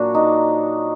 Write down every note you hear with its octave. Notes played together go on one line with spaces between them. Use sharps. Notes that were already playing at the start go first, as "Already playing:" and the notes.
Already playing: A#2 F#3 A#3 D4 F#4
D#4